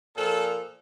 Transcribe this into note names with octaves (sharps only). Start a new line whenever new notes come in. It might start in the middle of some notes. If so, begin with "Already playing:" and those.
A#2 F3 A4